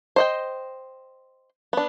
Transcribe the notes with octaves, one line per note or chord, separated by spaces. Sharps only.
C5 D#5 G5
B3 D4